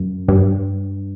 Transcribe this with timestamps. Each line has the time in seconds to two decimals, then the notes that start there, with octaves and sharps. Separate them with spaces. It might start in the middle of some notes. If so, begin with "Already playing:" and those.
Already playing: F#2
0.28 G2